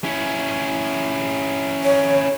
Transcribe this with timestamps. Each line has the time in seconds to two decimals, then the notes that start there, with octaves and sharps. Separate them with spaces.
0.04 C#4 E4
1.84 C#5